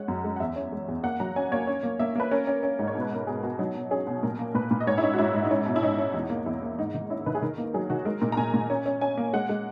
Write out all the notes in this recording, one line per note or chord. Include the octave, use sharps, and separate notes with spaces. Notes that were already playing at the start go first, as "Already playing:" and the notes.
Already playing: G#3 C#4 F#5
F#2
G#3
F#5
E2 E5
C#4
G#3
E2
A#3 F#5
F#3 A#5
C#4 G#5
A#3 C#5
C#4
A#3
A#3 E5
A#3 B4
C#4 A#4
C#4
C#4
G#2
C#5
B2
B4
B2 A#4
B2 G#4
B2 F#4
F#3 D#4
B2
C#4 G#4
B2
A#2 A#4
A#3
A#2 B4
A#2
D#5
G#2 C#5
E4
C#4 D#4
F#4
G#2 E4
G#2
D#4
C#4 E4
B2
E4
C#4 D#4
C#4
E2
A#3
E2 E4
A#3
G#2 D#4
D#3
C#4 E4
D#3 B4
G#4
D#3 A#4
A#3
F#3 G#4
D#3 F#4
G#3 A#4
A#2 A#4
A#5
A#2 G#5
A#2
C#4
C#4
C#4 G#5
A#3
G#3 F#5
G#3